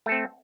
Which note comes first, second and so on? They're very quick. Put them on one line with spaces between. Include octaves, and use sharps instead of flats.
A3 A4 C4